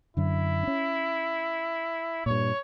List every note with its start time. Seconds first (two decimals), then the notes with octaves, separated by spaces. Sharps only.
0.17 F#2 D3 E4
0.63 C#4 D4
2.26 G2 A#2 C#5